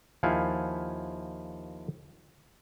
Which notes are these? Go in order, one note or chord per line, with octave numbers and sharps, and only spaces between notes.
D#2 F3 E4 F5 F#5 G#5